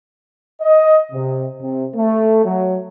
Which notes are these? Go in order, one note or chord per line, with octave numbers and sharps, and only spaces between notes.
D#5
C3
C3
A3
F#3